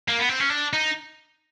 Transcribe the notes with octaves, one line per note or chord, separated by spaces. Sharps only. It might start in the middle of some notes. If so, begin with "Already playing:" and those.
A#3
B3
C4
C#4
D4
D#4